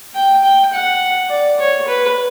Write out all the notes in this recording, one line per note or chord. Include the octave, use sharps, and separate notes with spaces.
G5
G5
F#5
D5
C#5
B4